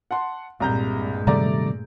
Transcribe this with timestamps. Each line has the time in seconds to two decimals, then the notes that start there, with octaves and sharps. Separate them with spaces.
0.11 F#5 A5 C6
0.60 C2 G2 A#2 G#3 A#5 G6
1.27 C3 D#3 G3 A3 D5 A#5